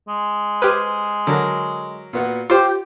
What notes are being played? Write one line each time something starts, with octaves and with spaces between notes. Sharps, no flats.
G#3
G4 B4 C5 G#5 F6
D3 F#3 A#4
A#2 B3 F#4
F4 G4 C5 D6